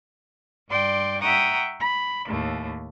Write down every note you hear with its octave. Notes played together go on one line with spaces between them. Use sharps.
G2 D5 G5 C6
E5 F#5 G5 A#5 C#6 D#6
B5
D#2 A2 A3